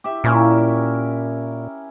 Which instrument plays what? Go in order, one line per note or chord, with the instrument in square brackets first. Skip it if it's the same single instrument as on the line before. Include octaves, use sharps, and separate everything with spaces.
[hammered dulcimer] G4 E5
[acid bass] A#2 [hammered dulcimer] C#4 E4 A#4